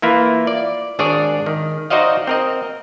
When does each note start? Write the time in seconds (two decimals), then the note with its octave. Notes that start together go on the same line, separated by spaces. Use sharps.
0.02 E3 A#3 E4 F4
0.47 D5
0.99 G#1 D4 G#4 C#5 D5
1.46 D#3
1.90 D#4 F#4 C5 D5 D#5 F5
2.27 C4 A#4 D#5